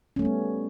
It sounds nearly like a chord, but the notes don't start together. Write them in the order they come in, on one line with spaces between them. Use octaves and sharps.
C#4 A3 G3 B3